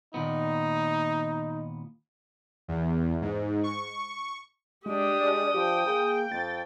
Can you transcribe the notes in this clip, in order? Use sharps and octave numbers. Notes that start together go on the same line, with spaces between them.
D#2 A#2 B3 D#4
E2
G#2
C#6
G#3 D4 G4 D#6
G#3 D5
F3 G4 G5
A#3 G#4
F2 A6